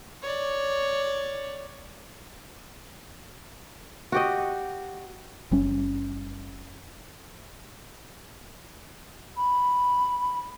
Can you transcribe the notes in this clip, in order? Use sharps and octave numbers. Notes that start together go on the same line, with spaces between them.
C#5 D5
F#4 G4 D#5
F#1 G3 C#4
B5